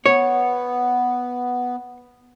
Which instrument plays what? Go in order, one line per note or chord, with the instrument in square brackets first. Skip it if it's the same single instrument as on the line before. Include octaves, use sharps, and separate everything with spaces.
[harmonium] B3 [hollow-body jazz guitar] C#5